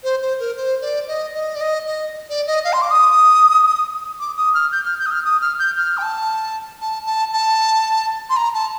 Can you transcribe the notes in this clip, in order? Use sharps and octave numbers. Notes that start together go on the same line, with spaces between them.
C5
C5
A#4
C5
D5
D#5
D#5
D5
D#5
D#5
D5
D#5
F5
C6
D6
D#6
D6
D#6
F6
G6
F6
G6
D#6
F6
D#6
F6
G6
F6
G5
A5
A5
A5
A5
C6
A#5
A5